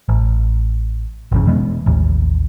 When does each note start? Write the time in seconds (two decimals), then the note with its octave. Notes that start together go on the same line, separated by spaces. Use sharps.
0.09 A1
1.32 G#1 F2 C#3
1.46 E1 E3 G#3 B3
1.86 A1 D#2